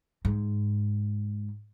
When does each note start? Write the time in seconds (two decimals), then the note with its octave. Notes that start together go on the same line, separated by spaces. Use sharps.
0.25 G#2